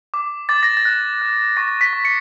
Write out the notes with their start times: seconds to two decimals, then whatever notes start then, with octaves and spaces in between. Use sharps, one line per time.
0.14 D6
0.49 D6 A6
0.63 A#6
0.77 A6
0.85 F#6
1.22 F#6
1.57 C#6 A#6
1.81 B6
1.93 C#6
2.05 C#7